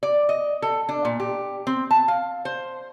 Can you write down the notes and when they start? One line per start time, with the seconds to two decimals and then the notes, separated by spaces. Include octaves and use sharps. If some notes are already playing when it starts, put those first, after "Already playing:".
0.03 D5
0.29 D#5
0.62 A4
0.89 D4
1.05 A#2
1.20 G4
1.67 C4
1.91 A5
2.08 F5
2.45 C5